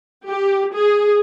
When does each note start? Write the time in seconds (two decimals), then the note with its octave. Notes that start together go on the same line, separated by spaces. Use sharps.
0.27 G4
0.73 G#4